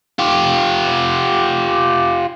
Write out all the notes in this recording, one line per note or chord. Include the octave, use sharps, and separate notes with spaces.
F4 G4